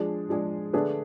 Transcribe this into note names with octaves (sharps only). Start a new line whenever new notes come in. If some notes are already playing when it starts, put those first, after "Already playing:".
Already playing: F3 G#3 D4 G#4
F3 G#3 D4 G#4
D3 A3 D4 G#4 B4